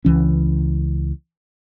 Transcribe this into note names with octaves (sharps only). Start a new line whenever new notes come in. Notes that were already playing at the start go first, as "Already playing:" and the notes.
C#2 E3 C#4